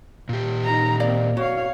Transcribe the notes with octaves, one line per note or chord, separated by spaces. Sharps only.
A#2 G4
D#4 A#5
A#3 C4 D5 F5
F#4 C#5 F5